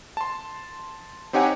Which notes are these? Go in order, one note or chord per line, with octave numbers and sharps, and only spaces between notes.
A5 C6
C4 D#4 G4 C#5 F#5 G#5